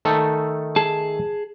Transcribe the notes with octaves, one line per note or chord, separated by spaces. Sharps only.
D#3 A3 A4
G#4 A5